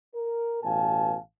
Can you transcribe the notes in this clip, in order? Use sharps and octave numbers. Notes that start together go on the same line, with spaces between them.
A#4
A1 B2 F5 G#5 A5